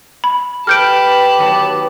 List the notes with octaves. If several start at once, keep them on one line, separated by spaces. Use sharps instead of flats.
B5
G4 A4 B4 A5 B5 F6 G6 D7
D#3 F#3 B3